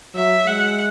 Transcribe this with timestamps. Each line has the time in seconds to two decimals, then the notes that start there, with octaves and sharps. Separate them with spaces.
0.14 F#3 E5
0.46 G#3 F#5